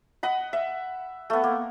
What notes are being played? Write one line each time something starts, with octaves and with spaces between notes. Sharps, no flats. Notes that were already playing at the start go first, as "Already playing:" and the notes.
D#5 F#5 B5
E5
A3 B3
A#3